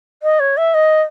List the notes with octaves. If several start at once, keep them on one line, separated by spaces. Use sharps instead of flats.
D#5
C#5
E5
D#5